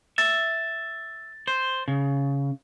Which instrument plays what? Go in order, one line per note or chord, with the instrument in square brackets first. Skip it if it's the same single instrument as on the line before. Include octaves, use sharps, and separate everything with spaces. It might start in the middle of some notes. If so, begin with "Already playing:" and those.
[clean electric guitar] E5 [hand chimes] A6
[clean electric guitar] C5
C#3